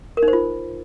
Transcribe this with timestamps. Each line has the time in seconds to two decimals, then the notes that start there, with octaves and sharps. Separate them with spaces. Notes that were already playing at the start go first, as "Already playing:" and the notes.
0.17 A#4
0.23 D#4
0.28 C5
0.33 F4